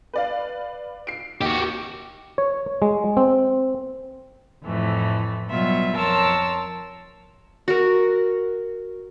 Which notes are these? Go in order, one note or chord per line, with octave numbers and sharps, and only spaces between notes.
B4 D5 F5
C7 D7
D#2 F#4 G4
C#5
G#3
C4
F2 A2 E3 A3
B2 F#3 G3 F4 E5
F2 A#4 C#5 A5 C6 E6
F#4 A#4